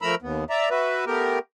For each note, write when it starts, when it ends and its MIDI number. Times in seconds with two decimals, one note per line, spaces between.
0.02 0.15 53
0.02 0.15 57
0.02 0.15 70
0.02 0.15 82
0.02 0.15 83
0.02 0.15 88
0.22 0.44 39
0.22 0.44 59
0.50 0.69 74
0.50 0.69 76
0.50 0.69 82
0.71 1.05 66
0.71 1.05 71
0.71 1.05 76
1.07 1.39 57
1.07 1.39 59
1.07 1.39 67
1.07 1.39 70